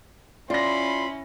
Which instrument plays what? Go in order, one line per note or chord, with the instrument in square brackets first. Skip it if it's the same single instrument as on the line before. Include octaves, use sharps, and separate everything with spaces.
[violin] C#4 E4 [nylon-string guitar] F4 [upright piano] D5 A#6 [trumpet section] B5 C6